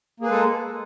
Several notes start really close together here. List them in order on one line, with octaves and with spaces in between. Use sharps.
A#3 G#4 B4 G#3 A4